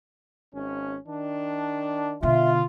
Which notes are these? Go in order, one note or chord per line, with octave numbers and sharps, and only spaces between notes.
G#1 C#4
D#3 D4
B2 D3 F4 E5